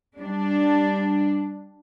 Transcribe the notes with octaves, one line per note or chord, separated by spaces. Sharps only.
G3 D4